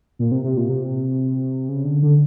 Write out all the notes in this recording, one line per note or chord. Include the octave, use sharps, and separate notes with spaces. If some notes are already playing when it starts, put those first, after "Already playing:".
A#2
C3
C3
A#2
C3
C#3
D3
D3